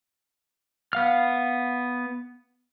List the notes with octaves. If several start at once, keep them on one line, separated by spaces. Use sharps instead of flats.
B3 F5 F6